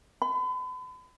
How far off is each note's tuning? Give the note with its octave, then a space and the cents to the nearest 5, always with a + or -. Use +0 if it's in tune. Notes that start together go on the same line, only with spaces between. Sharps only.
B5 +40